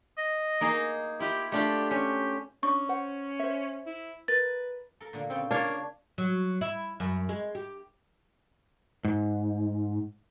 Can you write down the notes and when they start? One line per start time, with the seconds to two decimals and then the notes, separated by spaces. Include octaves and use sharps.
0.18 D#5
0.61 A#3 D#4 G#4
1.20 E4 F4 G4
1.52 A3 D4 F4 G4
1.91 C#4 G4
2.63 C#4 D4 C#6
2.89 C5 F#5
3.39 C5 E5
3.86 E4
4.28 A#4 B4 A6
5.01 A4 A#4
5.13 A#2 D3 A#3
5.30 C#3 C4 F4 G5
5.51 A#3 D4 F4 C#5 A5
6.18 F#3
6.61 E4
7.00 F#2
7.29 G#3
7.55 G4
9.05 G#2